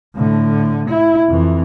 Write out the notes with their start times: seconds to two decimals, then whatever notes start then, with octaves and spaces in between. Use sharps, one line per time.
0.15 A2 D3
0.89 E4
1.29 F2 E3